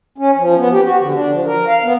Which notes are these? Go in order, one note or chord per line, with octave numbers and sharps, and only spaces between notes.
C#4
F3
B3
G4
F#4
D3
D4
F3
A#4
F5
B3